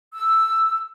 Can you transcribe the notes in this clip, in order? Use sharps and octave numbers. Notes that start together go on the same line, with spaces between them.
E6